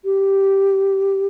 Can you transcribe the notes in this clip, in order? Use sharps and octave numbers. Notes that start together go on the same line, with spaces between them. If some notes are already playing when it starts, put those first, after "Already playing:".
G4